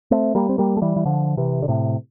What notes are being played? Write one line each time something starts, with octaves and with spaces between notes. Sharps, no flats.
A3 C4
G3 A#3
C4
G3 A#3
A3
E3 G3
E3
D3 F3
C3 E3
D3
A2 C3